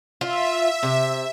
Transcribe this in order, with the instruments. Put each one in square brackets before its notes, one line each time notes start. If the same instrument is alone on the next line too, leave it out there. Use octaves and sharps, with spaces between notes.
[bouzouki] F4 [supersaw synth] E5
[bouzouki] C3